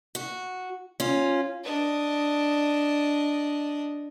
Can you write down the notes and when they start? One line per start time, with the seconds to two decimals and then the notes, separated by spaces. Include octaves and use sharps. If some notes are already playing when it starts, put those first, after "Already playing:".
0.15 F#4
1.00 C#4 F4
1.64 D4 D#5